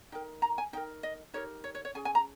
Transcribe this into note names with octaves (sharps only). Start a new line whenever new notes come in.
D#4 A#4 G5
A#5
G#5
D#4 A#4 G5
D#5
D#4 G4 A#4 C#5
C#5
C#5
C#5
C#4 G#4 G#5
G#5
A#5